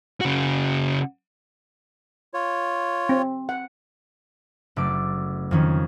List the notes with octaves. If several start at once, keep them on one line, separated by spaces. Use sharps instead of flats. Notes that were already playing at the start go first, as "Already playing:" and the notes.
C#3 F#4
F4 C#5
C4
F#5
F#1 A3 D5 D6
F2 D#3 C#4